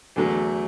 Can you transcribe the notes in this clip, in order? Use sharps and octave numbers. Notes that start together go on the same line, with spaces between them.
E2 D3 F#3 A3